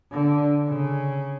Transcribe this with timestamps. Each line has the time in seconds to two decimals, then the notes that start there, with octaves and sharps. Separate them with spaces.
0.12 D3
0.68 C#3